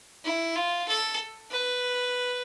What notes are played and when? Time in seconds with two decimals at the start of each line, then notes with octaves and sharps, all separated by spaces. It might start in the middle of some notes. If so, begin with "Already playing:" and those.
0.24 E4
0.56 F4
0.88 A4
1.51 B4